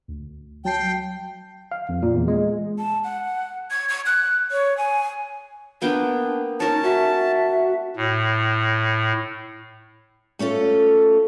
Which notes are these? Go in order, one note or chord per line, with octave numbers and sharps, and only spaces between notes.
D2
F#3 G5 A5 C7
F5
F2
A#2
E2
G#3
A5
F#5
G#6
G#6
F#6
C#5
G#5
A#3 B3 D4 G5
C#4 D#4 A#4 A5
F#4 E5
A2
A3 C#4 F4 A4